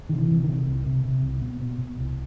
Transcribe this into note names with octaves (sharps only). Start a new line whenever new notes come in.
C3 D#3
E3
C3
C3 D#3
C2
C3
C3
C2
B2
B2
B2
C2